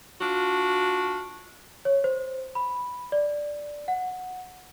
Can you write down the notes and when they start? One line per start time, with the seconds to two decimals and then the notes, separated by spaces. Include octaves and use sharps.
0.21 D4 F4 F#4
1.85 C#5
2.04 C5
2.55 B5
3.12 D5
3.88 F#5